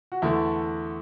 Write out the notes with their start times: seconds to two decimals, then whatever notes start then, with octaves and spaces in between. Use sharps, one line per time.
0.12 F#4
0.22 E2 D3 A3 E4